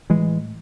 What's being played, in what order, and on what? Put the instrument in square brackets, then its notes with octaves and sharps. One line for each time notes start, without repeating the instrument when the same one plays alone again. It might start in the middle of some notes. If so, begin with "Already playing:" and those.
[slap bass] A2 E3 G#3